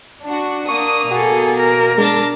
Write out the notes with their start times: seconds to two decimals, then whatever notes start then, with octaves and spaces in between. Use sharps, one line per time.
0.24 D4 F#4
0.69 A#3 D4 C#6 D#6
1.11 B2 F#4 G#4 A4
1.56 A#4
1.98 G#3 D4 A5